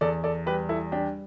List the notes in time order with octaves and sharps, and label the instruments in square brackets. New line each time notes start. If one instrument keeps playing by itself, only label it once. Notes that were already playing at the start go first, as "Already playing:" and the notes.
[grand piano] E2 A4 D5
A4 D5
G3 G4 B4
E4 A4
G3 D4 G4